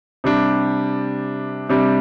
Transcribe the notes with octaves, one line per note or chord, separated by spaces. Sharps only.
C3 G3 D4
C3 G3 D4